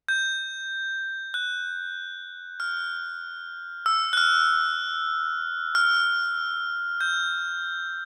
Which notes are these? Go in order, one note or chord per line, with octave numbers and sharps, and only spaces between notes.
G6
F#6
F6
E6
F#6
F6
F6
G6